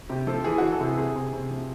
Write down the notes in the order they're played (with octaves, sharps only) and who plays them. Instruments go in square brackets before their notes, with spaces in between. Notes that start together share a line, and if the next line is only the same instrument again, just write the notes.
[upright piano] C3 G4
F3 A4
E3 G#4
E3 F#4
A4
C3 G#4
C3 G#4
C3
C3
F3